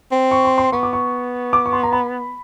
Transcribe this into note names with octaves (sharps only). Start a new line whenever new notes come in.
C4
C#6
C6
C6
B3 C#6
D6
C#6
D6
C#6
C6
A#5
B5